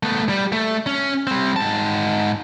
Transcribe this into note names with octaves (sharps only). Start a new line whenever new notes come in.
A3 B3
G3
A3
C#4
G3 C4
G#2 A5